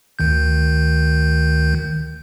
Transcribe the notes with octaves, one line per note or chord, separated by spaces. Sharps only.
D2 D#3 G6